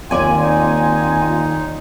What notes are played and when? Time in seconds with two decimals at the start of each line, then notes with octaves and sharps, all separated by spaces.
0.11 D#2 A#3 C4 F4 D5 G#5
0.42 D#4